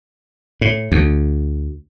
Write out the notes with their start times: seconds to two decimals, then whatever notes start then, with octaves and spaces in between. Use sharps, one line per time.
0.61 A2
0.92 D2